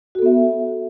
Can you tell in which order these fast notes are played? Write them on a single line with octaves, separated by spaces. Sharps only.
F#4 A4 B3 E5